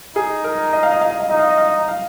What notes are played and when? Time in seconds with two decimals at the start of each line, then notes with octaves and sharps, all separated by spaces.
0.16 D#4 G#4
0.44 A#4
0.73 D#5
0.83 F5
0.92 D#5
1.01 F5
1.10 D#5
1.20 F5
1.29 D#4 D#5
1.39 F5
1.48 D#5
1.58 F5
1.67 D#5
1.88 F5